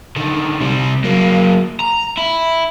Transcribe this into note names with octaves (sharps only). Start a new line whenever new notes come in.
D3 D#3
C3 G3
F#3 A#3
A#5
E4